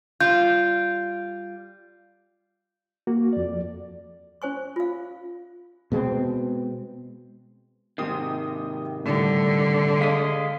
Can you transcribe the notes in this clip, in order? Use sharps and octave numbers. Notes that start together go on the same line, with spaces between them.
G3 F4 G6
A#3 F#4
F2 D5
C#4 C5 G#5 C#6
F4 F5
B2 G#3 A3 C4
G#2 C3 D#3 G5 D#6 C7
A2 D3 G3
G#3 D#5 F5 B6